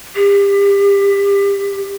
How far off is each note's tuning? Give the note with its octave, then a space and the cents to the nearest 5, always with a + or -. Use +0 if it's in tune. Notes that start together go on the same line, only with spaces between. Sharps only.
G4 +30